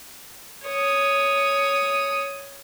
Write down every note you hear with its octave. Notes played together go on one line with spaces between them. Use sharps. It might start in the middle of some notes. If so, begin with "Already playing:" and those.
C#5 D#6